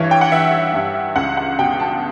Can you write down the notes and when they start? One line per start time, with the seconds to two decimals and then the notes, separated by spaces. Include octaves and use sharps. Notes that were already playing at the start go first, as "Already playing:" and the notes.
Already playing: G2 E3 C#5
0.11 G5
0.21 F#5
0.31 E3 E5
0.74 G2
1.16 C#2 F#5
1.37 F#5
1.59 B2 G5
1.80 A5